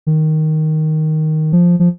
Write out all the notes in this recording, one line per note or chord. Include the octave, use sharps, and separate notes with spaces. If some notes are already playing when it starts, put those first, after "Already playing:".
D#3
F3
F3